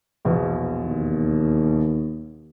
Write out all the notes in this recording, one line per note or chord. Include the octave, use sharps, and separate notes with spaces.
A#1 E2 B2
D#2